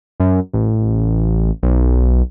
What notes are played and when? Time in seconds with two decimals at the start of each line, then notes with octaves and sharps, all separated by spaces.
0.20 F#2
0.54 A1
1.63 B1